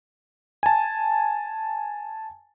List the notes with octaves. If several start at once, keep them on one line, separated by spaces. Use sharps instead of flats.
G#5 A5